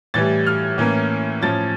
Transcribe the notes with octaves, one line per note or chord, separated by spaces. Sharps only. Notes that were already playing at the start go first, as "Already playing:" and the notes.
A2 E3 G3 A6
F6
A2 E3 A#3 C#4
A2 F3 C#4 A6